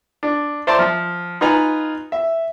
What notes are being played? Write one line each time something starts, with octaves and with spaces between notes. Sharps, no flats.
D4
C5 D5 E5 A5 A#5 C6
F3
D#4 F4 B4 G#5 A#5
E5